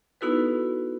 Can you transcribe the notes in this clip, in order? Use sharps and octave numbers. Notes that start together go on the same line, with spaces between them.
B3 D#4 E4 F#4 A4 B4